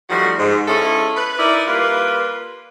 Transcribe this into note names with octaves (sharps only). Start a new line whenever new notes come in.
D#3 F3 G3 A3 F#4
G#2
G#3 C#4 E4 F4 G#4 A4
B4
D#4 E4 A#4 D5
G3 A#3 F4 B4